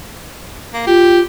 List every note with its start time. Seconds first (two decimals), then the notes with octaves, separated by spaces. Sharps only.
0.73 A#3
0.87 F4 G4